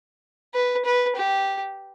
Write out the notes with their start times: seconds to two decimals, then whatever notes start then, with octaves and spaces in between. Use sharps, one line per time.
0.54 B4
0.85 B4
1.16 G4